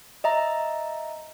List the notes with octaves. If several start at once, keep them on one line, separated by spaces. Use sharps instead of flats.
D#5 E5 A#5